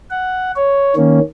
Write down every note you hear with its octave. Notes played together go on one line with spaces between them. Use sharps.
F#5
C#5
D#3 A#3 C#4